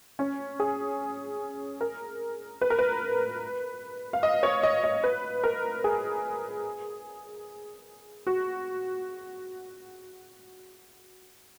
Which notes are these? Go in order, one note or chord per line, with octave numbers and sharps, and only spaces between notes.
C#4
G#4
A#4
B4
A#4
B4
F5
D#5
C#5
D#5
D#5
B4
A#4
G#4
F#4